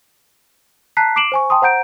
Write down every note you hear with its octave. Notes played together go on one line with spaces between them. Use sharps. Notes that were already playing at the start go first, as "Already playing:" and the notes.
A5 A#5 F#6 B6 C7
D6 C7 D7 E7 F#7
C5 G#5 C#6
G5 A5 C6 D#6
C5 F#5 A#5 G6 D7